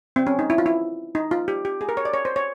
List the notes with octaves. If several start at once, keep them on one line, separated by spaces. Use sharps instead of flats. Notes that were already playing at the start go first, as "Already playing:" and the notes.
C4
C#4
D#4
E4
F4
E4
D#4
F4
G4
G4
G#4
A#4
C#5
D5
C#5
C5
C#5